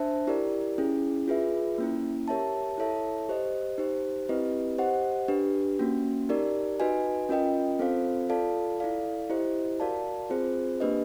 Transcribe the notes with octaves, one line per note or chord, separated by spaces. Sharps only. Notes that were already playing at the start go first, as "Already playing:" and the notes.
Already playing: D4 C5 E5 A5
E4 G4 A#4 D5
C#4 E4 G#4
F4 G#4 B4 E5
A#3 C#4 E4
G4 A#4 C#5 E5 A5
E4 A4 C#5 E5 A5
G4 C5 D#5
D#4 G4 C5
C4 E4 G4 B4 D#5
G4 C5 D#5 F#5
D4 G4 B4
A#3 C#4 F#4
D#4 G4 A#4 D5
D#4 F#4 B4 D#5 G#5
C#4 F4 A#4 D#5 G5
C4 F4 A4 C5 F5
F4 A4 D5 F5 A5
E4 A4 D5 F5
E4 G4 C5 D#5
F#4 A#4 D5 F5 A5
C4 F4 G#4 C5
A#3 D4 G4 B4 D#5